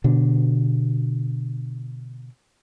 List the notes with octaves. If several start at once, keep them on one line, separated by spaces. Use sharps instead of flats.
B2 D3 D4